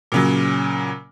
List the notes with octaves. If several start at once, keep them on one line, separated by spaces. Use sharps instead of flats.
A#2 C#3 F#3